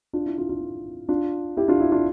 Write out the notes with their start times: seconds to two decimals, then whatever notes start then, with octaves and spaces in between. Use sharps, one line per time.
0.13 D4 F4
0.26 E4
0.38 D4 F4
0.49 D4 F4
0.61 D4
1.09 D4 F4
1.57 E4 G4
1.68 D4 F4
1.80 E4
1.92 D4 F4